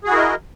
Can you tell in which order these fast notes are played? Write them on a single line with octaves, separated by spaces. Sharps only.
G#4 F#4 E4 A#4 D#5